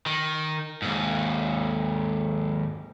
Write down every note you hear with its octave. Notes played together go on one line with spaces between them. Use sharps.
D#3
D#2 G#2